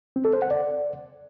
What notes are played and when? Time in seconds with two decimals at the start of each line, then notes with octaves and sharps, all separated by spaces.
0.16 C4
0.25 A4
0.33 C5
0.42 F#5
0.51 D5